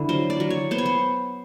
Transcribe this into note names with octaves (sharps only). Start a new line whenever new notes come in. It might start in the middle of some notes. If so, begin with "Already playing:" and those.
Already playing: D3 D4 E4
F#3 C5
D5
F#3
C#5
B3 C5
C#5
C5